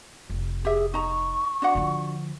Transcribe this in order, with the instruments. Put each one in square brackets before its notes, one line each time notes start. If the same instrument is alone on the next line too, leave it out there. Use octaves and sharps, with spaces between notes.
[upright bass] F1
[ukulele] G4 E5 [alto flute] G#4
[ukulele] D#4 A#5 [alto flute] C#6
[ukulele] D4 F#4 F#5
[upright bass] D3 F3